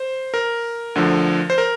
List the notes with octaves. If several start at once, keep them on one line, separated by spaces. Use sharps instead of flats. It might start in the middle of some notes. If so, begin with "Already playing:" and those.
Already playing: C5
A#4
D2 D3 F3
C5
A#4